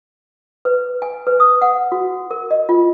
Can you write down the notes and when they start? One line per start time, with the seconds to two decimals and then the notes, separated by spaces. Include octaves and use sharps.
0.65 B4
1.02 G#5
1.27 B4
1.40 D#6
1.62 F#5
1.92 F#4
2.31 A#4
2.51 D#5
2.69 F4